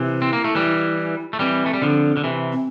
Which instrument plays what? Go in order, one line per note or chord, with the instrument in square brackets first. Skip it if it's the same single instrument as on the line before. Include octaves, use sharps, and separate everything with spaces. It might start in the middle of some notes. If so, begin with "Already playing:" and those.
Already playing: [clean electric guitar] C3 E3 [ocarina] E4
[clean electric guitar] C4
A#3
A3
E3 G3
A3
[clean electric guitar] E3 G3 [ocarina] C4
[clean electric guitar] A3
G3
D3 F3
D3
C3 E3
[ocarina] C4